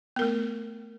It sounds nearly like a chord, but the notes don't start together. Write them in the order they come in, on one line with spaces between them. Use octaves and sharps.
B3 A#4 A3